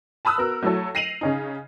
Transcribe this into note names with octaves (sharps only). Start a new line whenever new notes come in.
A5 B5 D#6 E6 F#6
B3 F#4 A#4
F#3 A3 E4 F#4 A4 C#5
A#6 C7 D#7 F7 F#7
C#3 C#4 D#4